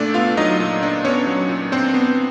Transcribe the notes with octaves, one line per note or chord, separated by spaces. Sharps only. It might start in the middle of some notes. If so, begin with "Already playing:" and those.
Already playing: A#2 A3 D4 A4 D5
B3 F4 F5
F#3 D#4 D#5
A#2
D4
B3 C#4 C#5
F#3
A#2
C4 D4 C5
B3